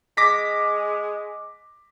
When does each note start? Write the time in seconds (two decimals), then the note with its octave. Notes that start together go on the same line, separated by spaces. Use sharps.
0.17 G#3 D6 A#6 B6